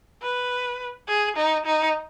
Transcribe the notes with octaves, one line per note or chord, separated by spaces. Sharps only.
B4
G#4
D#4
D#4